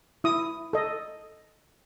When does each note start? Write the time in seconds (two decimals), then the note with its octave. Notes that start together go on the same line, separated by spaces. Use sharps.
0.24 E4 D#6
0.73 A4 D#5